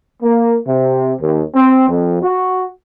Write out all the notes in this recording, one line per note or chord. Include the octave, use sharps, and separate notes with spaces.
A#3
C3
D#2
C4
F2
F#4